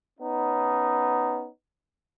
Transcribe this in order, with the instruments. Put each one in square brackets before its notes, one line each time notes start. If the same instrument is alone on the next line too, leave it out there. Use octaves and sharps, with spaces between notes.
[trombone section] B3 C#4 D#4